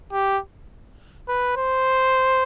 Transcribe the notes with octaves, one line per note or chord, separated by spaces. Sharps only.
G4
B4
C5